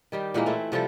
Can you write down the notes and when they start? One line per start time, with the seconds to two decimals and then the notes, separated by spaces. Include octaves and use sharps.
0.12 D#3 G3 G4
0.34 A#2 E3 G#3 A#3
0.46 A3 C4 E4
0.72 C3 F3 G3 A4